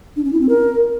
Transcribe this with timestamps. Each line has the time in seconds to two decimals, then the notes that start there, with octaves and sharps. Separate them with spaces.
0.16 D4
0.24 C#4
0.33 E4
0.41 C4
0.49 A#4